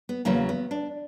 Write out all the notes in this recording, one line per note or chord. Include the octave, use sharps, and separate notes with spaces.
B3
E2 C#3 F#3 A#3
B3
D4